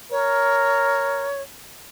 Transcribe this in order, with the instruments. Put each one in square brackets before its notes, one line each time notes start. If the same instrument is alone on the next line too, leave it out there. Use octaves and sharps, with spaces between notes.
[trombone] A#4 [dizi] C#5